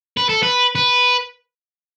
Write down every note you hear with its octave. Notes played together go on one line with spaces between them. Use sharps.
B4
A4
B4
B4